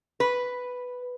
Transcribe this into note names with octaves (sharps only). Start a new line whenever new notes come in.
B4